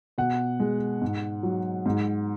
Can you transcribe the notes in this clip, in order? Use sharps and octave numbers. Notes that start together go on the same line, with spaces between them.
B2 F#5
G#3
G#2
F#3
G#2